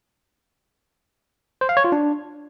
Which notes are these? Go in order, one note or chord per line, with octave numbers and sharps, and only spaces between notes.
C5
F5
C#5
F4
D4